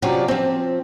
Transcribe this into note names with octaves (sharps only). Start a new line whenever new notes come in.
C3 F#3 C#4 F4 G4 D5
F3 C4